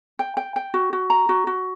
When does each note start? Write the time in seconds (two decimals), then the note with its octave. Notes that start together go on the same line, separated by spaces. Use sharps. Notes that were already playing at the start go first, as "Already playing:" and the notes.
0.19 G5
0.37 G5
0.56 G5
0.74 F#4
0.93 F#4
1.10 A#5
1.29 F#4
1.47 F#4